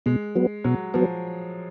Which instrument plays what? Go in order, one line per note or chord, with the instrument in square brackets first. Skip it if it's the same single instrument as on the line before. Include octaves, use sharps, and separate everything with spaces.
[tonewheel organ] B2 [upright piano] G#3
[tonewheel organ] F#3 B3
[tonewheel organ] B2 [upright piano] F#3
[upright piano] F3 [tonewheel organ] F#3 B3